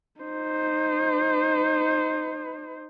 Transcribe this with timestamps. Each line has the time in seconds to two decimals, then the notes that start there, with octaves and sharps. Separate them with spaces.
0.20 D#4 C5